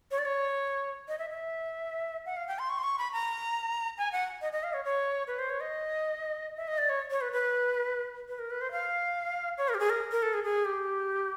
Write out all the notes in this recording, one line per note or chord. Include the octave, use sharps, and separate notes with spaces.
C#5
D5
C#5
D#5
E5
E5
F#5
F5
G5
C6
C#6
C6
C#6
B5
A#5
G#5
F#5
D#5
D#5
F5
C#5
C#5
B4
C5
C#5
D#5
E5
D#5
D5
C#5
C#5
B4
B4
B4
A#4
B4
C5
F5
C#5
A#4
G4
G#4
A#4
A#4
A4
G#4
G#4
G4